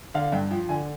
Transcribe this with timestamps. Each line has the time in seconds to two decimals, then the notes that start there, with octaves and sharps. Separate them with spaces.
0.14 D3 F5
0.32 G2 G5
0.51 F3 G5
0.69 D3 G#5